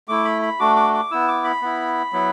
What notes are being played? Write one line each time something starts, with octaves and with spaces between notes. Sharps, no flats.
A3 E4 D6
B5
B5
A3 D4 F#4 D6
D6
D6
B3 E4 E6
D6
B5
B3 E4
F#3 B3 E4